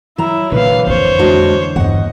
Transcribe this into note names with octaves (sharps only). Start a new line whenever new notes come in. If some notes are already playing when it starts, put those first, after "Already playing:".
F#3 E4 A#5
A#2 D3 E3 A#3 B4 F5
F2 A3 C5 C#5
G#3 D4 F#4
E2 G2 D#5 F#5